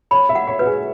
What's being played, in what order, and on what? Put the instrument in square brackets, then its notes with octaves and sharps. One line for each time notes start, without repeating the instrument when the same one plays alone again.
[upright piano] C#5 [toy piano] B5
[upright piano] E5
[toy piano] F#5
[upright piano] C#5
[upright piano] F#4 [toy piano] B4
[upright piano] G#4